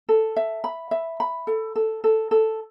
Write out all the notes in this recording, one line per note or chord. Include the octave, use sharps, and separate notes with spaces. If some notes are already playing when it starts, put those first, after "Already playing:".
A4
E5
B5
E5
B5
A4
A4
A4
A4